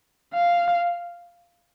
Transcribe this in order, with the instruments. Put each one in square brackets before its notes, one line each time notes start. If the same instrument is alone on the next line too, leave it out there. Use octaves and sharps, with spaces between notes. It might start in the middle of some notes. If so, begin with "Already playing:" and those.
[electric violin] F5